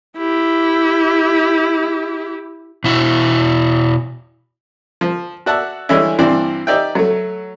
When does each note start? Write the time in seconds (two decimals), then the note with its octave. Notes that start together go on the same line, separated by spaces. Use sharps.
0.18 E4 G4
2.84 B2 E4 F#4
5.01 F3
5.46 F#4 D5 E5 F#5 A5
5.89 D3 E3 G3 G#3 C#4 E4
6.19 G2 E3 C4 C5 D5
6.67 D#4 G4 D5 E5 G5
6.95 F#3 A3